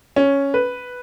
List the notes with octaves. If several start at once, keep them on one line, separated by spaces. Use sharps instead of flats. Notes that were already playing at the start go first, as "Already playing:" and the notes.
C#4
B4